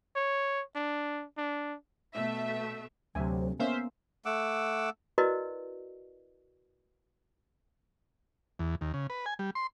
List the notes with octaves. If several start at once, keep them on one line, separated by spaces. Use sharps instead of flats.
C#5
D4
D4
B2 A3 E5
D2 C3 F#3 E5 G#5
A#3 B3 C#4 C5 E5 F5
A3 F#5 D6 E6
E4 F#4 A#4 B4 D5 D#5
E2
D#2
C#3
B4
G#5
G3
C6